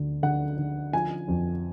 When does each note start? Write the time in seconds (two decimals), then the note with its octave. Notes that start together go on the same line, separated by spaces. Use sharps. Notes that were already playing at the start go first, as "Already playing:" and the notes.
Already playing: D2 D3
0.23 D3 F#5
0.58 D3
0.93 F3 G#5
1.28 F2